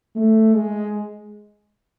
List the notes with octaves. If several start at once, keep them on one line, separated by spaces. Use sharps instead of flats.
A3
G#3